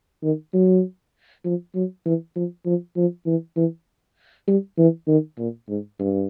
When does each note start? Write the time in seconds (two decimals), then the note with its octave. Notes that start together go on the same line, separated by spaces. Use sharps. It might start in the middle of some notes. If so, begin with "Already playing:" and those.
0.23 D#3
0.54 F#3
1.45 F3
1.75 F#3
2.05 E3
2.36 F3
2.66 F3
2.96 F3
3.26 E3
3.57 E3
4.47 G3
4.78 E3
5.08 D#3
5.38 A#2
5.68 G#2
5.99 G2